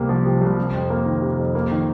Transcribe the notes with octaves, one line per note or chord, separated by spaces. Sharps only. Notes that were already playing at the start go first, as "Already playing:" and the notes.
Already playing: C2 C3 A#3
F3
C3
C2
C3
F2
A#3
D#3
C3
F2
A#3
D#3